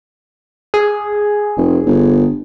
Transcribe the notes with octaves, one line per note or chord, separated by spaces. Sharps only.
G#4
F1
G1